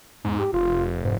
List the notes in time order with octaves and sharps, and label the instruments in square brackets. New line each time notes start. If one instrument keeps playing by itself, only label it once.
[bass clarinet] E2 [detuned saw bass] G#2
[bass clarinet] G4
[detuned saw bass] F1 [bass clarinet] F4
[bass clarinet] G#2